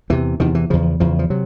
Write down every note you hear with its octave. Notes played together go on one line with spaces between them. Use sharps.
E2 C3 E3
E2 C3 D#3
E3
E2 C#3 F3
E2 C#3 F3
F3
C3 F#3